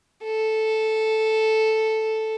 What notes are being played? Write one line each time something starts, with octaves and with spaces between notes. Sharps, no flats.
A4